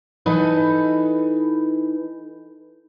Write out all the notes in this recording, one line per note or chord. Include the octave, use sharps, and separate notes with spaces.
E3 D#4 A4 B4